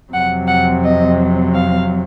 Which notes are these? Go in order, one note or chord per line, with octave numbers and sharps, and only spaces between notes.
F2 C3 F#3 F#5
F#5
D#5
F5